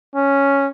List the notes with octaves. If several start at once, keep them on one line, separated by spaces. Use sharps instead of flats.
C#4